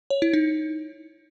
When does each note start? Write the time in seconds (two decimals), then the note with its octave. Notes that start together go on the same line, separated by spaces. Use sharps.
0.10 C#5
0.22 E4
0.34 D#4